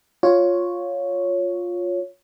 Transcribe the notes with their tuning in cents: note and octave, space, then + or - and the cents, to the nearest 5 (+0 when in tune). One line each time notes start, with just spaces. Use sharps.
F4 +10 C#5 +0